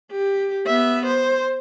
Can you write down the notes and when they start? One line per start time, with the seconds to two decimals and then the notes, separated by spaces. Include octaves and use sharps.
0.12 G4
0.67 B3 E5
1.06 C5